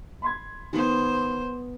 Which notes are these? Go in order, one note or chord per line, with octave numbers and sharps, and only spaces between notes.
B5 C6 G#6
D#3 B3 G#4 C5